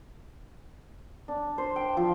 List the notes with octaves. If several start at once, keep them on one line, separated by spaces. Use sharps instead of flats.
D4
C5
G5
F3